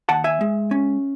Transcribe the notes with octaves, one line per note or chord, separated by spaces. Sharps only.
D#2 F#5 A5
E5 G#5
G#3
C#4